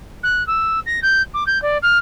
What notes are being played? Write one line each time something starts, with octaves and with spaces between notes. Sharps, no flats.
F#6
E6
A#6
G6
D6
G6
D5
F6